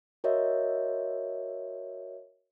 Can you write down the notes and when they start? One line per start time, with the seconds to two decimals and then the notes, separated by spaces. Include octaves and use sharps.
0.24 F#4 A#4 C#5 D#5 E5